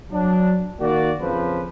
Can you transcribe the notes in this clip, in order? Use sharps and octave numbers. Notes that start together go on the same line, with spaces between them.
F#3 D4
D#3 A#3 F#4 D5
F2 C#3 F3 B4